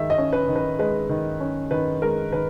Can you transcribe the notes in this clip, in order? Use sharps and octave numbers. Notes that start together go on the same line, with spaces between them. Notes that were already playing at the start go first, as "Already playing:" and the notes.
Already playing: D#3 G#3 E5
D#5
C#4
B4
D#3
B4
G#3 B4
D#3
C#4
D#3 B4
G#3 A#4
D#3 B4